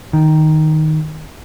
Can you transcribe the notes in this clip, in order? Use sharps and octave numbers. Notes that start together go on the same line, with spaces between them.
D#3